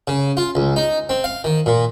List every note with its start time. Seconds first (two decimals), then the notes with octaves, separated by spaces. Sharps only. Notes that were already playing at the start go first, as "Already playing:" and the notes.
0.08 C#3
0.37 F4
0.55 C#2
0.76 D#4
1.09 C4
1.24 F5
1.44 D#3
1.66 A#2